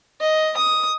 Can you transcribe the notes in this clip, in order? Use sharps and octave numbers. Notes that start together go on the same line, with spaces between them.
D#5
D#6